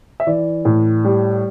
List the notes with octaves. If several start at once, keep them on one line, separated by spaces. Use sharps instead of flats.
E5
E3 D5
A2
G3